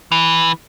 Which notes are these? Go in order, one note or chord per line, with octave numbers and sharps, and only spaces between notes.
E3